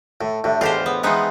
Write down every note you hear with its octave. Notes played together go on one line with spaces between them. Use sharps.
A2 A3
A2 A3 D4 G4
E2 A2 G#3 F4 G4 C5 F5
B3
E3 F3 G#3 B3 D#4 F#5 G5 C6